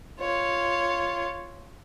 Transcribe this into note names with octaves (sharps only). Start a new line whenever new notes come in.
F4 C#5